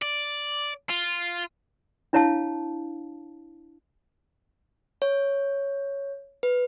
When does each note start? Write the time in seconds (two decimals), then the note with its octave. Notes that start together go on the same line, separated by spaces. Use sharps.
0.02 D5
0.90 F4
2.13 D4 E4 C#5 F5 A5
5.02 C#5
6.43 B4